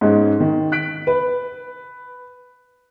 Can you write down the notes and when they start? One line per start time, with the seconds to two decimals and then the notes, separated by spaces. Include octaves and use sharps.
0.01 G#2 G#3 C#4
0.40 D#3
0.72 F#6 B6 D7
1.07 B4